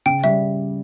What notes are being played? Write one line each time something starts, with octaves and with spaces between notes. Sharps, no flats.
C#3 G5
G3 E5